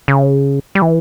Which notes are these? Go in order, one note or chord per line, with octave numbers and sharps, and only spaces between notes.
C#3
G3
E3